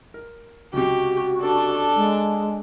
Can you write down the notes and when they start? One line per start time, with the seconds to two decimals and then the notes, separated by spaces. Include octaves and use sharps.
0.14 A#4
0.73 C#2 C3 F#4 G4
1.41 D4 A4
1.96 G#3